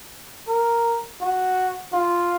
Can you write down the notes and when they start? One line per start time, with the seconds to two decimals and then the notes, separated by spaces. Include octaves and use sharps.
0.48 A#4
1.21 F#4
1.93 F4